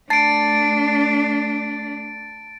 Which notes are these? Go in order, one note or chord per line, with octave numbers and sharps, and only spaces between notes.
A3 D4 A5 A6 C7 D7